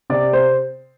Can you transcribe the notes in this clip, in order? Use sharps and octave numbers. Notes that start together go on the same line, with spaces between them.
C3 D5
C5